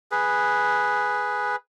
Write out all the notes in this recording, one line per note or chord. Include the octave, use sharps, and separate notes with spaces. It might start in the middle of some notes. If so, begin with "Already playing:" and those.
G#4 B4